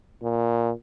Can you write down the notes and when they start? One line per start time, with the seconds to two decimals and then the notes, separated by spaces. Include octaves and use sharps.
0.22 A#2